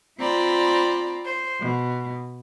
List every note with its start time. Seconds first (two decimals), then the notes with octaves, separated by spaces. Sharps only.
0.19 C4 F4 D5 A#5 B5
1.24 C5
1.59 B2